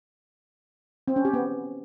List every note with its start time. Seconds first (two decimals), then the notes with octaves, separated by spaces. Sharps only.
1.08 C4
1.16 C#4
1.25 G4
1.34 B3